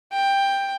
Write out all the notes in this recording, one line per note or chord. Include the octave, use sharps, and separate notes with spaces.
G5